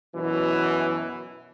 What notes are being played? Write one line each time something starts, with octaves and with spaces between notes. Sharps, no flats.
F#2 B2 E3